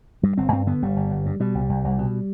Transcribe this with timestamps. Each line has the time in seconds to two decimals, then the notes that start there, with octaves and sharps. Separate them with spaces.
0.23 G2 G3
0.37 G1 C4
0.52 G2 C4
0.66 D3 B3
0.82 G1 G3
0.96 G1
1.11 G1
1.26 G2
1.40 B2 G3
1.55 C2
1.69 C2
1.84 C2
1.98 B2